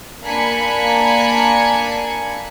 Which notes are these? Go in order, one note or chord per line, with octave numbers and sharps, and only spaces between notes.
A#3 D4 G#5 B5 C#7